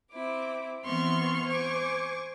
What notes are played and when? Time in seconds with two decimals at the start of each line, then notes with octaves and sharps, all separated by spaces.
0.11 C4 E4 D6
0.84 E3 B3 C4 C6 C#6 F6
1.46 C5 G#5 C#6 D6